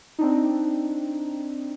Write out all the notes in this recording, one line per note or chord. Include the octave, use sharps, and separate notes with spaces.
C4 D4 D#4